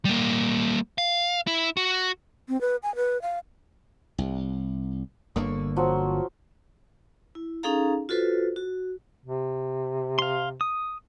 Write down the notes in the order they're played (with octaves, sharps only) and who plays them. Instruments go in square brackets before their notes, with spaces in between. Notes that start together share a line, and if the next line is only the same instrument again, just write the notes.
[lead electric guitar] G3 A#3
F5
E4
F#4
[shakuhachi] C4
B4
G#5
B4
F5
[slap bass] C2
[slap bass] G1 D3 A#3 [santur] C#6 E6
[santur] F3 F#3
[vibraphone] E4
C#4 D#4 G#4 A4 F5 A#5
F4 F#4 A4 B4 C5
F#4
[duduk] C3
[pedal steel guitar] F5 C6
D#6